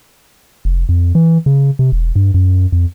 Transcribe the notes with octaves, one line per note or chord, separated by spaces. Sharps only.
F1
F2
E3
C#3
C3
E1
G2
F#2
F2